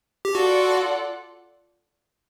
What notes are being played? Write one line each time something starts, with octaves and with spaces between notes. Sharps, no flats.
G4
F4 F#4 A4 D5 F#5